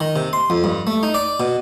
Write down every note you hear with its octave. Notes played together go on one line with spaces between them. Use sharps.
D#3
C3
C6
F2
G2
A3
D#4
D5
B2